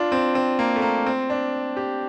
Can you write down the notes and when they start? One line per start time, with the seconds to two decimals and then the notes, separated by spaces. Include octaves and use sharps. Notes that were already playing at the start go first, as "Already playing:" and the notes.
Already playing: D4 F4
0.12 C4
0.35 C4
0.59 A#3
0.76 A3
0.82 A#3
1.06 C4
1.30 D4
1.77 G4